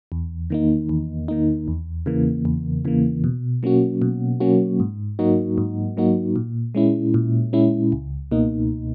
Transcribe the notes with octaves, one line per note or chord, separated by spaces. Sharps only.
E2
D#3 A#3 D#4
E2
D#3 A#3 D#4
E2
C#3 E3 A#3
E2
C#3 E3 A#3
B2
F#3 A#3 C#4 F#4
B2
F#3 A#3 C#4 F#4
G#2
F#3 A#3 D#4 F#4
G#2
F#3 A#3 D#4 F#4
A#2
G#3 C#4 E4
A#2
G#3 C#4 E4
C#2
B2 A#3 D#4